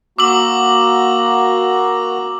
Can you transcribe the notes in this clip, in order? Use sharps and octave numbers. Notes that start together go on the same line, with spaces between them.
A#3 F#4 A#5 D6 E6 F#7